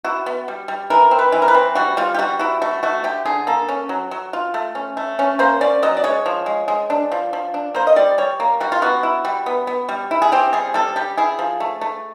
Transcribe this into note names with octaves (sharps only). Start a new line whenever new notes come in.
E4 F#4
B3
G3
G3
E3 A#4
C4
B4
E3
A#4
B4
C4
G3 F#4
G3 F4
G4
G3 F#4
E4 F#4
A3 F#4
A3 F#4
D3 G4
D3 G#4
A#3 A4
C#4
F#3
F#3
F4
A3
C#4
A3
C#4
A#3 C5
C#4 D5
F#3 D#5
D5
G#3 C#5
F3
G#3
G#3
D4
F3
F3
D4
A#3 C5
D#5
G3 D5
G3 C#5
A#3
G3 F#4
F4
B3 F#4
E4
G3
B3
B3
G3
E4
G#4
C4 G4
G3 G#4
G3 A4
G3 G4
E4 G#4
F3
A3
A3